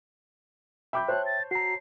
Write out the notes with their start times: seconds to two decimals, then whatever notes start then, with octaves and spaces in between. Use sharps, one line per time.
0.93 E5 G5 B5 D6 G6
1.08 C5 C#5 A5 F#6
1.26 A6
1.51 F#4 A#5 C7